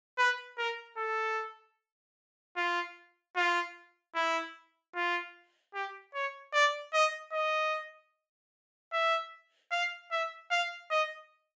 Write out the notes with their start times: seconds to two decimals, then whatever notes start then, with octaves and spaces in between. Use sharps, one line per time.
0.18 B4
0.58 A#4
0.98 A4
2.57 F4
3.36 F4
4.15 E4
4.95 F4
5.74 G4
6.14 C#5
6.54 D5
6.94 D#5
7.33 D#5
8.92 E5
9.72 F5
10.11 E5
10.51 F5
10.91 D#5